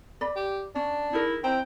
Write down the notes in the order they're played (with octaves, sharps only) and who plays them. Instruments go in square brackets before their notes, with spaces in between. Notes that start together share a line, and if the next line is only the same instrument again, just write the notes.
[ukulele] D5 B5
[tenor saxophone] G4
[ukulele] C#4 [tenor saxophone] D4
[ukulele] D#4 G#4 A#4 [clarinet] E4
[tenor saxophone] C4 [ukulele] E4 D#5 A#5 [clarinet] G5